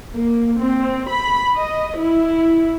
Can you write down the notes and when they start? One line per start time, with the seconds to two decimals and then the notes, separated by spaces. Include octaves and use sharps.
0.13 A#3
0.60 C4
1.08 B5
1.56 D#5
1.99 E4